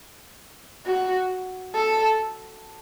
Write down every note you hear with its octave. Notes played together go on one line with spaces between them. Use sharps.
F#4
A4